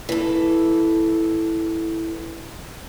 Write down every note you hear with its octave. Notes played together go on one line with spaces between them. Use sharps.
E3 A4